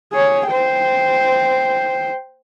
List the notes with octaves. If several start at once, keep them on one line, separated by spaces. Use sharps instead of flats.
G#4 C#5
C5 G5